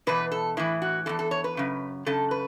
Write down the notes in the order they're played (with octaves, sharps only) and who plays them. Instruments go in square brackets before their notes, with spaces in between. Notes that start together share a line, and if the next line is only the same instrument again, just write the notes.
[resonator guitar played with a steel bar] E2 B2 B4
A4
A2 E3 E4
F#4
E2 B2 A4
A4
C#5
B4
F#2 C#3
F#2 C#3 A4
B4